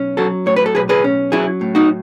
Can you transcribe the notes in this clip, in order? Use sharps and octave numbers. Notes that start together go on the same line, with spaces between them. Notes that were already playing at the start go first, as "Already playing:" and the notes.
Already playing: B1 C#4
F#3 F#4 A4
A2 C#5
B4
A4
B1 G#4 B4
G#4 B4
C#4
F#3 E4 G#4
A2
D#4 F#4